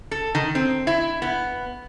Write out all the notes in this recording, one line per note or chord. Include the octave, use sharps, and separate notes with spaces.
A4
D#3
C4
E4
B3